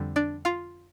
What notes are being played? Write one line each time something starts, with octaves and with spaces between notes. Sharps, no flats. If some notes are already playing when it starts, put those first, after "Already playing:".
Already playing: F2 D3 G3
D4 D5
F4 F5